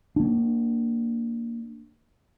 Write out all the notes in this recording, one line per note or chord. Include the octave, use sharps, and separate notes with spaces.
A#3 D4